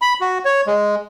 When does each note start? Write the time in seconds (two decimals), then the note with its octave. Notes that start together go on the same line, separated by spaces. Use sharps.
0.02 B5
0.21 F#4
0.45 C#5
0.67 G#3